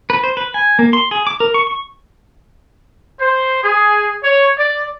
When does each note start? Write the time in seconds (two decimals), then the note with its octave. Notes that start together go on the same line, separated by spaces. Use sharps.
0.10 B4
0.24 C5
0.37 B4
0.54 G#5
0.79 A#3
0.93 C6
1.11 G#4
1.27 D6
1.40 A#4
1.54 C#6
1.67 C#6
3.20 C5
3.64 G#4
4.23 C#5
4.57 D5